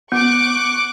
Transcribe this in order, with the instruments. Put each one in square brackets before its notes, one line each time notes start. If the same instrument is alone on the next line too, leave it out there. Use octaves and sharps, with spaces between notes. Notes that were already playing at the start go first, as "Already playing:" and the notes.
[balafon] B3 [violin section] C#6 D6 F#6